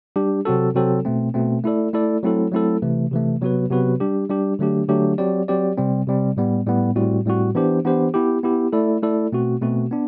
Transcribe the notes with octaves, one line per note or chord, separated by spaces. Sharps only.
G3 D4 G4
C3 F#3 C4 F#4 A4
C3 F#3 C4 F#4 A4
B2 A3 C4
B2 A3 C4
A3 E4 A4 D5
A3 E4 A4 D5
F#3 A3 C4 E4 A4
F#3 A3 C4 E4 A4
C3 E3 A3
C3 E3 A3
C3 F#3 B3 F#4 B4
C3 F#3 B3 F#4 B4
G3 D4 G4
G3 D4 G4
D3 F#3 A3 D4 G4
D3 F#3 A3 D4 G4
F#3 C4 G4 D5
F#3 C4 G4 D5
C3 G3 C4
C3 G3 C4
A2 G3 B3
A2 G3 B3
A2 G3 C4 F#4
A2 G3 C4 F#4
E3 B3 D4 G4 C5
E3 B3 D4 G4 C5
B3 E4 G4
B3 E4 G4
A3 E4 A4 D5
A3 E4 A4 D5
B2 A3 C4 F#4
B2 A3 C4 F#4
B3 D4